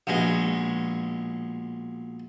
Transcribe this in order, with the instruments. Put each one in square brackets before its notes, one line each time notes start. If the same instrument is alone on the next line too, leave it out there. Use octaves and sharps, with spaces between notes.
[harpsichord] A#1 B2 G#3